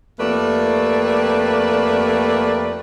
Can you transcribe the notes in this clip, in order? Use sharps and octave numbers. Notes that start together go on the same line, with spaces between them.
F2 A3 A#3 G4 B4 D5